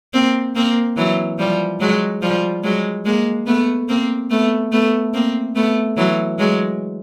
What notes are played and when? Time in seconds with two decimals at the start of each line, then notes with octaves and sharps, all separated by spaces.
0.14 A#3 C4
0.55 A#3 C4
0.97 E3 F#3
1.39 F3 G3
1.80 F#3 G#3
2.22 F3 G3
2.64 F#3 G#3
3.05 G#3 A#3
3.47 A3 B3
3.89 A#3 C4
4.30 A3 B3
4.72 A3 B3
5.14 A#3 C4
5.55 A3 B3
5.97 E3 F#3
6.39 F#3 G#3